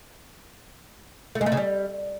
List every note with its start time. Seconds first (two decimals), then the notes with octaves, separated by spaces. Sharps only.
1.35 A3
1.41 G#3
1.46 A3
1.52 C#3
1.57 G3